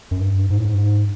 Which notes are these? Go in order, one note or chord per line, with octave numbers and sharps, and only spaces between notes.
F#2
G2
G#2
A2
G#2
G2
G#2